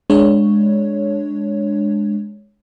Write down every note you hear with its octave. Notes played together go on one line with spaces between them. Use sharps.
G#3 D4 C#5